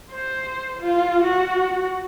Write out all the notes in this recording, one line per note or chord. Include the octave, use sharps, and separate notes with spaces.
C5
F4
F#4